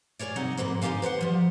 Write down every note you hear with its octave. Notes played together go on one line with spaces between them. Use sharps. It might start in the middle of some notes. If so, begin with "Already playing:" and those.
F4 G#4 A#4 C#5 D5
C3 G3 D#4 F#5
F2 G#2 A#3 C4 B4
D3 D#4 F4 G4 F5 G#5
B4 C5 D#5 F#5
F3 G3